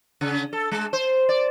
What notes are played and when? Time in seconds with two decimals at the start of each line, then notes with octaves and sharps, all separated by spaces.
0.21 C#3
0.53 A4
0.71 G#3
0.93 C5
1.29 D5